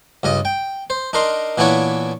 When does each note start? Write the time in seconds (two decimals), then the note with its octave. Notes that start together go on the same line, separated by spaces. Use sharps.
0.23 C#2 G2 D#5
0.45 G5
0.90 C5
1.13 D4 D#4 A#4 C6
1.58 A#2 E3 B3 D4 E4 C#5